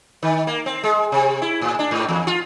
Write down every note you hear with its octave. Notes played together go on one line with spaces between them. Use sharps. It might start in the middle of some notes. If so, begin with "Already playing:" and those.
D#3
A#3
C4
G#3
C3
E4
A2
D4
G#2
E2
F4